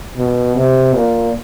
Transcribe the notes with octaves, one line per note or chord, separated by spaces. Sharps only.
B2
C3
A#2